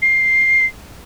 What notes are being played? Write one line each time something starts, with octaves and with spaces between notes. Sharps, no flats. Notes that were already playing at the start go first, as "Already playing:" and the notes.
C7